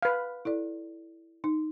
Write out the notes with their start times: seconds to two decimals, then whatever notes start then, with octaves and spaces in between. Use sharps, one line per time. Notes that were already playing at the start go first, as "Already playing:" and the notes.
0.02 B4 F5
0.45 E4 A4 D5
1.44 D#4